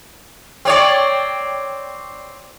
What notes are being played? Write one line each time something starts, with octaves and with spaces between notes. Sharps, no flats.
C4 C#5 D5